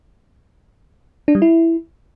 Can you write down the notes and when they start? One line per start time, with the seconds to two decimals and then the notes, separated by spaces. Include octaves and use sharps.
1.28 D4
1.35 G3
1.42 E4